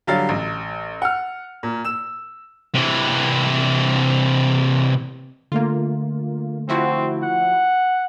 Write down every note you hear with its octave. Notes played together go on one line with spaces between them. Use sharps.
D3 F#3 G3 F5 A6
A1
F#5 F6
A#2
E6 E7
C3 E3
D3 A3 A#3 F4
F3 C4 E4 F#4
F#5